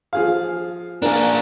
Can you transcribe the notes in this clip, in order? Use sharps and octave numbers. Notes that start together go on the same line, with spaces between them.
F3 G#4 F5
A#3 D4 G#4 A#4